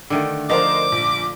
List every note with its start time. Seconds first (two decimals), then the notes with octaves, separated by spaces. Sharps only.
0.10 D3 D#3 A3
0.49 F3 D4 A#4 C5 D#5 D6
0.92 A#1